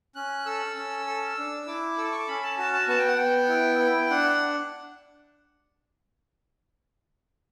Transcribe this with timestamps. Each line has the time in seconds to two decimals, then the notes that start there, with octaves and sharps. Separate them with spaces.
0.15 C#4 F#6
0.46 A4 E6
0.77 C#4
1.07 A4
1.37 D4
1.67 E4 D6
1.97 A4 E6
2.04 D6
2.12 C#6
2.19 D6
2.28 C#4 B5
2.43 A5
2.58 F#4 A5
2.73 A5
2.88 B3 A5
2.98 G5
3.08 F#5
3.17 B3 G5
3.49 E4
3.79 E4
4.10 D4 F#5